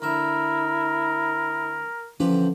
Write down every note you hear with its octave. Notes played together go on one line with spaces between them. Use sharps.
D2 E4 A#4 E5
D3 E3 F3 C#4 G4